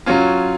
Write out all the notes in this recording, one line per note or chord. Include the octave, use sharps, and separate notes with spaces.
F#3 C#4 F4